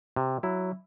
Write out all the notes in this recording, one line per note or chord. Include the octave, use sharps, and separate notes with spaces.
C3
F#3 E4